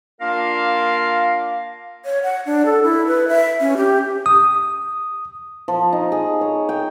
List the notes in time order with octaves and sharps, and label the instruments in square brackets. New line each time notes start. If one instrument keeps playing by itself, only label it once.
[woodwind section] A#3 D4 F4 A#4 F5
[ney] C#5
F#5
D4
A4
E4
B4
E5
C#4
G4
[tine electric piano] D#6
[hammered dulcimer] F3
D#4
G#4
C#5
G5